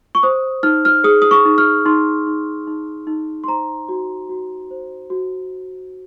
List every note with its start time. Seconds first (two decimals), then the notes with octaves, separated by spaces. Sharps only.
0.15 C#6
0.23 C5 D#6
0.63 D#4 F6
0.85 F6
1.04 G#4 D#6
1.22 D#6
1.31 C#6
1.45 D#4
1.58 F6
1.86 D#4 C6
2.27 D#4
2.67 D#4
3.07 D#4
3.44 C6
3.48 C5 A#5
3.89 F#4
4.29 F#4
4.71 C5
5.10 F#4